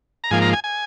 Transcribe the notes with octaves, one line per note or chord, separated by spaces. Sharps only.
A#5
G#2 F3 A#3 G#5
A#5
G#5
G#5